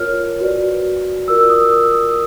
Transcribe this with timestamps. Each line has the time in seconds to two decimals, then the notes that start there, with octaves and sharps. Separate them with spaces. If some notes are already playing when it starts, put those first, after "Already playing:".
Already playing: F4 A#4 C#5 F6
0.41 F#4 B4 D5
1.28 F4 A#4 D5 E6
1.50 D#6
1.71 E6
1.93 D#6